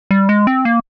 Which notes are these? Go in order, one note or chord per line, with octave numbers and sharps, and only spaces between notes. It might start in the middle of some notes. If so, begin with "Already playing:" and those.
G3
G#3
C4
A#3